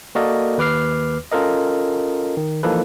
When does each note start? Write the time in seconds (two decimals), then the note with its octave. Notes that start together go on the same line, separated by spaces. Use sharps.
0.15 A#3 F#4 A4 A#4 D5 D#5
0.58 D#2 B4 D6 F6 C7
1.32 C#4 F4 A4 A#4 D#5
2.37 D#3
2.63 E3 F3 A#3 D#4 A4 B4